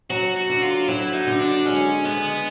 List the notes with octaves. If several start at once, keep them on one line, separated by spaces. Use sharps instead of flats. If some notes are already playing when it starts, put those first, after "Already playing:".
F#3 F#4
F#4
D3
F4
F#3 E4
D#4
D3
D4
G#3 C#4
G#3 B3